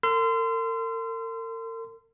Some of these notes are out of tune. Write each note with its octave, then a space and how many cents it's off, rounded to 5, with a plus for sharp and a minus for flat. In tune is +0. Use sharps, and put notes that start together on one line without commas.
A#4 -45 C6 -25 E6 +45